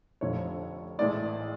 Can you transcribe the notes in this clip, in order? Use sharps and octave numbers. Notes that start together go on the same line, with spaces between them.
F1 F2 D3 F3 C#5
A1 A2 G#3 D5